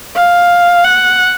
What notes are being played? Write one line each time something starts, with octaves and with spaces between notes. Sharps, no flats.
F5
F#5